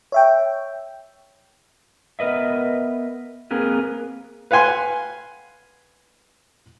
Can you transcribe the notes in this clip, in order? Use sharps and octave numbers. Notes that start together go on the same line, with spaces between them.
C#5 E5 G5
B3 A#4 B4 D#5 E5
A#3 C4 G#4 A#4 B4
B4 F5 F#5 G#5 C6